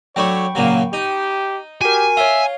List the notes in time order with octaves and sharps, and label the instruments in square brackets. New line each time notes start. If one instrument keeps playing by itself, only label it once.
[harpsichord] F#3 A3 D4 [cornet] C#5 [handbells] G5 B5 C#6
[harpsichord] A#2 C#3 F#3 [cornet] A#3
[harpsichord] D#4 [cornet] G4
[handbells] F#4 A#4 [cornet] G4 [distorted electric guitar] G#5
[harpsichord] F4 [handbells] C#5 F5 [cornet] E5